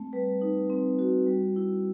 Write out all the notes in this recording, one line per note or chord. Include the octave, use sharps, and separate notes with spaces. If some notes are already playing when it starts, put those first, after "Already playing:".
Already playing: A3 C4
G3 B4
D#4
C4
F#4
G3
E4